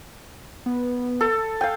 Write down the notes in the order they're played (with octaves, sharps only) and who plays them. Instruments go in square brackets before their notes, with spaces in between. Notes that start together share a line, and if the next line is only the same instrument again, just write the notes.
[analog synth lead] B3
[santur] A4
[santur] F5 G5 [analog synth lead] G#5